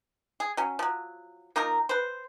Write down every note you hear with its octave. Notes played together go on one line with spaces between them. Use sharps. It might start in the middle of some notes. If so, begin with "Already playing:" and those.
G#4
F#3 C#4
F3 F#3
A#3 D#4 F4 A#4
B4 C5